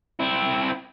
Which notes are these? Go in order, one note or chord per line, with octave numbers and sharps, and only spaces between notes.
C4 E4